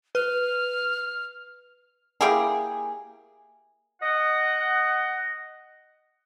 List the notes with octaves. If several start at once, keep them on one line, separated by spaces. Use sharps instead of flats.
B4 F6
A#3 E4 G4 G#4
D#5 F#5